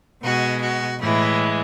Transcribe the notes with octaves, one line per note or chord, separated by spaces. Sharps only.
B2 G#3 F#4
F#4
A2 E3 G#3 E4